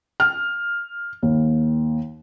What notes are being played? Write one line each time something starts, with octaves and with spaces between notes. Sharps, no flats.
F6
D#2